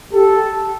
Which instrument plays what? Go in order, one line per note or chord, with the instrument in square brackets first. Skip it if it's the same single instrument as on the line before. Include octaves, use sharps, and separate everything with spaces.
[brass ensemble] G4 A4